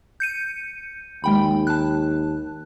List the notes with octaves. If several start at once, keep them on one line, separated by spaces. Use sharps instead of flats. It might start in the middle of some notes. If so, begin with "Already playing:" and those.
G6 C#7 D#7
D#2 G#3 G5 B5
A5 F#6